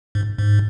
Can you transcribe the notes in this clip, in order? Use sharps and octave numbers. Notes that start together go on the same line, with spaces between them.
G#2
G#2